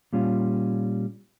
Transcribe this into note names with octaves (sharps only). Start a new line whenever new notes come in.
A#2 G3 C#4 F4